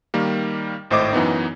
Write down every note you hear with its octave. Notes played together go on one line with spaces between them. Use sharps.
D#3 G3 A#3
G#1 A2 C5 D#5 D6
F#2 E3 B3 D#4